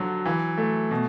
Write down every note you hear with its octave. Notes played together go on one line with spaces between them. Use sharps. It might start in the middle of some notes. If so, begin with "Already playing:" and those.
Already playing: D3 F3 F#3
E3
A3
B2